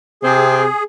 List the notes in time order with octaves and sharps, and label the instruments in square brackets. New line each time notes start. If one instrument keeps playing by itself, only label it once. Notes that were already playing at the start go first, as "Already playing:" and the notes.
[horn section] C3 C4 [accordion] G#4